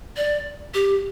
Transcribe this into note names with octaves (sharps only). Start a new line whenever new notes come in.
D5
G4